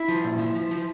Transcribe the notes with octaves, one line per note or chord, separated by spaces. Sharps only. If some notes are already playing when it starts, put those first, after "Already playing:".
Already playing: E4
F3
A#2
F3
F3
F3